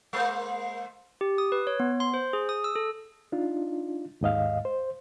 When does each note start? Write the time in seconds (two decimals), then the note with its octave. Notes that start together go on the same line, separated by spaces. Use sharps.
0.13 G#3 A#3 C5
1.21 G4
1.38 D#6
1.52 B4
1.67 C#5
1.80 B3
2.00 C6
2.14 C5
2.33 G#4
2.49 D#6
2.64 E6
2.76 A4
3.32 D4 D#4 F4
4.21 D#2 G#2 D#5 F5
4.65 C5